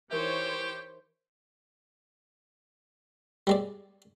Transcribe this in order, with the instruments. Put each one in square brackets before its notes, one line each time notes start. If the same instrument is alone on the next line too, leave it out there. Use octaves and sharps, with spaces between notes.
[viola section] E3 C5 C#5 [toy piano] D#4 A#4 E5 [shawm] G4
[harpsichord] G3 G#3 D5